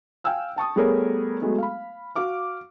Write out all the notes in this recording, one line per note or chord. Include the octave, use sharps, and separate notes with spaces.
F5 G5 G#5 E6 F6
G5 A5 C#6 D#6
G3 A3 B3 G#4 A#4 C#5
F#3 G#3 A3 B3
F5 B5
F#4 F5 D6 F6